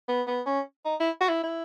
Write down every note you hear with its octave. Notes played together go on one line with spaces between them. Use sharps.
B3
B3
C#4
D#4
E4
F#4
E4
E4